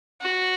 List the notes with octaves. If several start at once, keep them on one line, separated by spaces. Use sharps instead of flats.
F#4